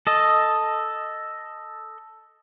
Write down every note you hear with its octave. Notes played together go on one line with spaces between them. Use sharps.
A4 D#5